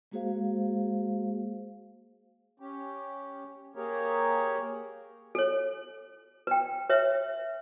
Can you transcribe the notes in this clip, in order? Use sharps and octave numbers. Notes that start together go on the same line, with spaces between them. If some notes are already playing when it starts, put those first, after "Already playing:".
G#3 A#3 F#4 G#4 C5 F5
C#4 G4
A#3 G4 G#4 A#4 C#5
A4 C#5
B4 G5
B4 C#5 E5